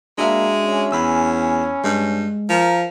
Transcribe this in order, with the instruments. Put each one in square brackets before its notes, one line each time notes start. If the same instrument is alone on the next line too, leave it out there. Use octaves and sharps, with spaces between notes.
[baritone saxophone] G#3 [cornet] A#3 [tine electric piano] D4 F#4 E5
[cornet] C#4
[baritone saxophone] E2 [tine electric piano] G#5 B5 E6
[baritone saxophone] G2 [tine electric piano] G#3
[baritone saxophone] F3 [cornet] A#4